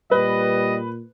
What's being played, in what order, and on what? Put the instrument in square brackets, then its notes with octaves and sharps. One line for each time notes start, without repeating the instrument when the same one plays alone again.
[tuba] A#2 [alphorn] G3 [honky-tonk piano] B4 [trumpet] D#5